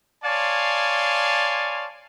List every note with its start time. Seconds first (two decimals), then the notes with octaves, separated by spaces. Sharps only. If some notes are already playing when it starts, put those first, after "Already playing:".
0.24 C#5 D5 F5 G#5 A5 C6